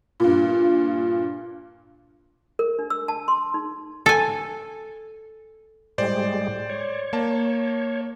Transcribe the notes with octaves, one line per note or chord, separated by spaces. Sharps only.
G2 A#2
A#4
D4
E6
A5
C6
D#4
A4 G#5
A2 G3 G#3 C5 D5
C#5
A#3 A5